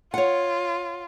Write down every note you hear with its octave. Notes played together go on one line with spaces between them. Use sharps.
F4 C#5 F#5